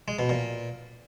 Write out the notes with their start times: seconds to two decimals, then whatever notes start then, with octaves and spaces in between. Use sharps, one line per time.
0.08 G#3
0.19 B2
0.29 A#2